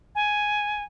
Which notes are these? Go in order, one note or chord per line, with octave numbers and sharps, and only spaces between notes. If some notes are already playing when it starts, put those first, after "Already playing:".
G#5